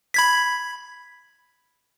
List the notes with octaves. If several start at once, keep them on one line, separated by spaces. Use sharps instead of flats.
B5 G#6 B6